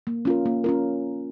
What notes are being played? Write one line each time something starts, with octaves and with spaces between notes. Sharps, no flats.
A#3
C#4 F4 A#4
A#3
C#4 F4 A#4